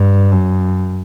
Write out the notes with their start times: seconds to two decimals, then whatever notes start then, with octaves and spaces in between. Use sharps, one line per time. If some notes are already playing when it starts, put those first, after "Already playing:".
Already playing: G2
0.32 F#2